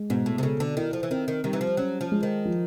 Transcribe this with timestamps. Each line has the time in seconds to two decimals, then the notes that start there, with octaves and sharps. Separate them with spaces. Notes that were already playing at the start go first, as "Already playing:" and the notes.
Already playing: G#3
0.10 G#2 B2
0.26 A2
0.38 C3
0.43 C#3 A4
0.60 D3
0.77 D#3 E4
0.93 F3
1.03 E3
1.10 D#3 C4
1.28 D#3
1.44 D#3 G3
1.53 E3
1.61 F3
1.77 F#3 C#4
2.01 F3
2.12 G#3
2.23 D#3
2.45 F3